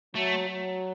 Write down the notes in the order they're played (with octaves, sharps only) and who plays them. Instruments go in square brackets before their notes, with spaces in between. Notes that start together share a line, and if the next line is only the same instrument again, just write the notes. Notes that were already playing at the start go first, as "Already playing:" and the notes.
[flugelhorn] F#3 [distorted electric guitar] A3
[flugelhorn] F#3